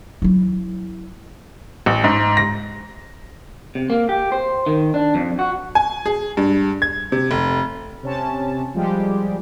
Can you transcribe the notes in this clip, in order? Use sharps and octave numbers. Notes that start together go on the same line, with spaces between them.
F#3 E4
A1
G#2
A#6
C3
A#3
G4
C5
D#3
D4
F2
F#4
G#5
G#4
G2
G#6
C3
F1
C3 C#4 A5
F3 G3 G#3 G4